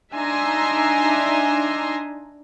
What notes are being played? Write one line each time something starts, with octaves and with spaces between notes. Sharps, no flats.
D4 D#4 E5 G#5 A#5 C6